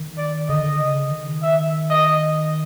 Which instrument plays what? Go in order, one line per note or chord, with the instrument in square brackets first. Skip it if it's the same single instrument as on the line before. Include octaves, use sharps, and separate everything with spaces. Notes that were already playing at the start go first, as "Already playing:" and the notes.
Already playing: [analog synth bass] D#3
[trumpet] D5
[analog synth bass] D3 [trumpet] D#5
[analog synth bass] C#3
D#3
[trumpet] E5
D#5